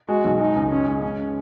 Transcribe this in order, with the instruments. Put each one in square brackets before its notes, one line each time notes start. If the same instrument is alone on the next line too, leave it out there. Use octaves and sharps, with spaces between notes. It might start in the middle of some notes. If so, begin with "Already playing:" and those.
[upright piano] G#3 [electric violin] F#4
[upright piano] B1
[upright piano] G#3 [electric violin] D#4
[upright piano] C#2
[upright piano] G#3 [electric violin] C#4
[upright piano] G#3
[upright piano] C#3 [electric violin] C#4